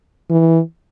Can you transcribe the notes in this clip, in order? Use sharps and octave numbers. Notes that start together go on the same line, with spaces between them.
E3